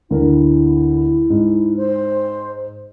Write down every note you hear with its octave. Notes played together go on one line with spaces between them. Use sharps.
D2 E4 A#4
G#2
C5